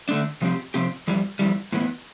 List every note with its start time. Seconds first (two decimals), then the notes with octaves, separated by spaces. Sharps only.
0.09 D3 A3 D4
0.42 C3 F3 C4 G4
0.74 C3 F3 C4 G4
1.07 F2 E3 G3
1.39 F2 E3 G3
1.72 A2 E3 B3